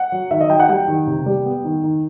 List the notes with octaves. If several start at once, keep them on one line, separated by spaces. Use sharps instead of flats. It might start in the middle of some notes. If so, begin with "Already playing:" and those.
Already playing: F#5
F#3
D#3 E5
D#5
F#3 G5
F#5
G3 G5
D#3
C3
G3
B3
D#3
D#3